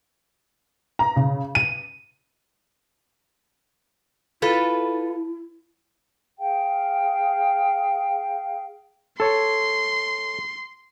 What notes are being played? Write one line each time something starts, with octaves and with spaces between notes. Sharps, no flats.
A#5
C#3
D#7
E4 F4 A4 B4
G#4 F5 G5
A4 C#5 C6